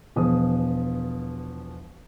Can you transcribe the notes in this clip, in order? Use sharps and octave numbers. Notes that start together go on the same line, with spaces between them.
E1 B2 F3 G#4 D#6